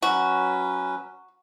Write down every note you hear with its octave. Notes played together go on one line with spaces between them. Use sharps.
F#3 C#4 F#4 B4